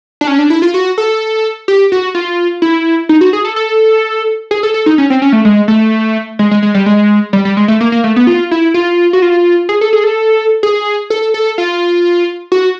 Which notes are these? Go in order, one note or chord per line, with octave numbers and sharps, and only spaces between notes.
D4
C#4
D4
E4
F4
F#4
A4
G4
F#4
F4
E4
D#4
F#4
G#4
A4
A4
G#4
A4
A4
D#4
C#4
C4
C#4
A3
G#3
A3
G#3
G#3
G#3
G3
G#3
G3
G3
G#3
A3
A#3
A#3
A3
B3
F4
E4
F4
F#4
F4
G#4
A4
G#4
A4
G#4
A4
A4
F4
F#4